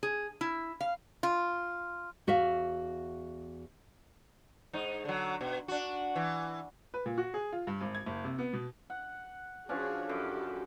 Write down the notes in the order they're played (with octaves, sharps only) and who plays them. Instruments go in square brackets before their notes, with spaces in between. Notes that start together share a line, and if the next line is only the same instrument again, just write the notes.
[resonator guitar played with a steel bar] G#4
E4
F5
F4
[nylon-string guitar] E2 F#4 E5 F5
[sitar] G#2 D#4
D3 F#3
B2
D4 F#4
E3
[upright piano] B4
A#2
F#4
G#4
F4
G2
G#1
G#6
F#1
C3
B3
B2
[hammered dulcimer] F#5
[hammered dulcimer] F3 C#4 D4 [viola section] F#4 G#4 C#5
[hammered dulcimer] F#2 [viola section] E4 G4 A4